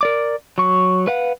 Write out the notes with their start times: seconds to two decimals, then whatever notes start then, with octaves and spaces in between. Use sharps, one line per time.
0.01 A#4 D5 D6
0.58 F#3 C#6
1.07 B4 F5 F#5